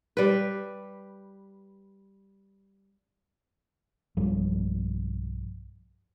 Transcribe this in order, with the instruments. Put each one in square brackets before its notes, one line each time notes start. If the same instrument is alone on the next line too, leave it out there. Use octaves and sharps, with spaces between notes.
[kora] G3 B4
[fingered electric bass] B1 G2 F3 G3